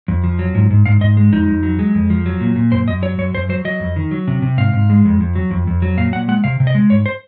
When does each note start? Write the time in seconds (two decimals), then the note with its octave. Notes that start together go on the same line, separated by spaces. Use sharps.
0.08 F2
0.24 F3
0.39 F#3
0.55 G#2
0.70 G#2
0.86 G#2 F5
1.01 G#2 D#5
1.17 G#3
1.33 F2 D#4
1.48 F2
1.63 F#3
1.79 G#3
1.95 F2
2.10 F3
2.26 F#3
2.41 A#2
2.56 A#2
2.71 F#2 C5
2.88 F#2 D#5
3.02 F#3 C#5
3.18 F#2 C#5
3.34 F#2 C5
3.49 F#3 C5
3.65 F#3 D#5
3.80 F2
3.96 D#3
4.11 F#3
4.28 C3
4.42 C3
4.57 G#2 F5
4.73 G#2
4.90 G#3
5.05 F2
5.20 F2
5.35 F#3
5.51 F2
5.67 F2
5.82 F#3
5.97 A#2 F5
6.13 A#2 F#5
6.28 G#3 F#5
6.44 C3 F5
6.60 C3
6.67 D#5
6.75 G#3
6.90 G#2 C#5
7.06 C5